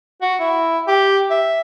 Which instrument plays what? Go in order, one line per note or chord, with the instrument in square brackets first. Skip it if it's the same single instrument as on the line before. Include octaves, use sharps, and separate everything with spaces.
[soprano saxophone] F#4
E4
G4
E5